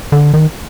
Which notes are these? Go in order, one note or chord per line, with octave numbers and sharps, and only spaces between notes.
D3
D#3